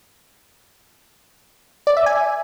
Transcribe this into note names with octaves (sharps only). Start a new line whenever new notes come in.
D5
E5
G#5